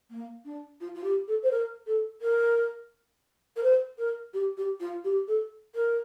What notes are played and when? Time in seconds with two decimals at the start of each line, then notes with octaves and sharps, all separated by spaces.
0.10 A#3
0.45 D4
0.81 F4
0.95 F4
1.04 G4
1.28 A4
1.43 C5
1.51 A#4
1.87 A4
2.22 A#4
3.56 A#4
3.63 C5
3.98 A#4
4.34 G4
4.57 G4
4.80 F4
5.04 G4
5.28 A4
5.75 A#4